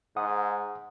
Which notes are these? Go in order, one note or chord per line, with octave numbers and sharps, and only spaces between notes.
G#2 F#5 D#6